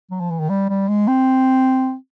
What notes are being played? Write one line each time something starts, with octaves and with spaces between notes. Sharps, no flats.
F#3
F3
E3
D#3
G3
G3
G#3
C4